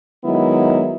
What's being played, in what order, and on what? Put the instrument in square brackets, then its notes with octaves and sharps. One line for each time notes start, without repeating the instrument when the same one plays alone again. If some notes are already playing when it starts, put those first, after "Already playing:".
[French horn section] D#3 F#3 G#3 B3 D#4 E4